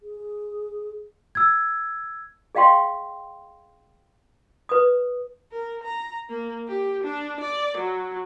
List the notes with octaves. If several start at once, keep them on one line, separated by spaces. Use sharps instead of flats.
G#4
E6 G#6
G#4 D#5 F5 G5 C6 C#6
B4 D#6
A#4
A#5
A#3
G4
D4
D5
F#3